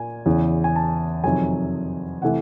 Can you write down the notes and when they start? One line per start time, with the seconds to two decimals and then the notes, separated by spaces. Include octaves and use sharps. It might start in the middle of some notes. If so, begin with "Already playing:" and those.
Already playing: A#2 A#3 G#5
0.26 E2 C#3 E3
0.64 G#5
0.76 A5
1.24 F2 C3 D#3 F#3 G#5
2.22 C3 E3 A3 F#5